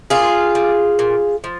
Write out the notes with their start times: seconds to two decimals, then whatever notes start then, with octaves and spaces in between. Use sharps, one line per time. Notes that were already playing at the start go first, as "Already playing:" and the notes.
0.10 A#2 F4 G#4
0.55 G3
0.99 A#2
1.44 F3